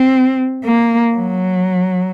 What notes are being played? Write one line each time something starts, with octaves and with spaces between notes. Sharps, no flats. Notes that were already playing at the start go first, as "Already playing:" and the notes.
Already playing: C4
A#3
F#3